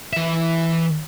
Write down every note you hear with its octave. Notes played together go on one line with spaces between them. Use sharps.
E3 E5